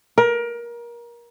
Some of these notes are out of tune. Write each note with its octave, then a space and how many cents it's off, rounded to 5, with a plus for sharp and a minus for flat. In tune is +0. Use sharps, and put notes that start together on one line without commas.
A#4 +25